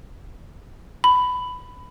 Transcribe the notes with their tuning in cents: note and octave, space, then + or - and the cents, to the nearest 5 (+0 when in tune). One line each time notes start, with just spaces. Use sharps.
B5 +15